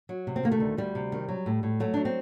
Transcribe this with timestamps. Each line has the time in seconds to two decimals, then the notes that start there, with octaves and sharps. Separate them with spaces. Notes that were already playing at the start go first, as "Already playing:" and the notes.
0.09 F#3
0.27 C3
0.36 C4
0.43 D#3 A#3
0.52 A3
0.60 D2
0.77 D2 G3
0.95 C3
1.12 D#3
1.29 F#3
1.46 A2
1.63 A2
1.80 F#3 A3
1.94 F#3 D4
2.05 C4